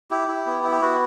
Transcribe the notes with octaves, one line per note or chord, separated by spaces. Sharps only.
E4 G4
E4
B3
E4
G4
B3 F#4